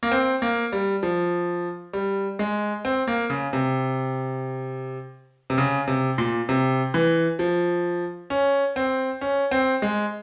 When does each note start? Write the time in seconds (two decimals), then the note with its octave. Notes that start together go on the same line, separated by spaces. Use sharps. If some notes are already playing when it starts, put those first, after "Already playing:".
0.03 A#3
0.11 C4
0.42 A#3
0.72 G3
1.03 F3
1.93 G3
2.39 G#3
2.85 C4
3.08 A#3
3.30 C#3
3.53 C3
5.50 C3
5.58 C#3
5.88 C3
6.18 A#2
6.49 C3
6.94 E3
7.39 F3
8.30 C#4
8.76 C4
9.21 C#4
9.51 C4
9.82 G#3